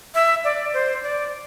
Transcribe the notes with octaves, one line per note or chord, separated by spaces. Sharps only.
E5
D5
C5
D5